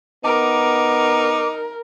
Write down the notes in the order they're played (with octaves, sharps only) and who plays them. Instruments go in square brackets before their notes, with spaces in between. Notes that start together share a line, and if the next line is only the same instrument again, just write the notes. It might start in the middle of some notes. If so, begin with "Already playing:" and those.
[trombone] B3 [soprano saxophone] D#4 [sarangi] A#4 [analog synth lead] D6